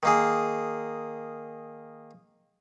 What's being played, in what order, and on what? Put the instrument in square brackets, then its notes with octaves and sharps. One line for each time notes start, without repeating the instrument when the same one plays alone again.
[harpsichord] D#3 A#3 G#4